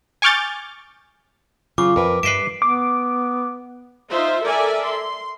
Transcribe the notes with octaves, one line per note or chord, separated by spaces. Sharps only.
G#5 C#6 D6 F6 G6 A6
C#3 F#3 F4 D6
F2 A#4 B4
G2 B4 D#5 E5 C7 D7
B3 D6
D#4 F4 C5 E5
A4 A#4 D5 E5 G#5
C6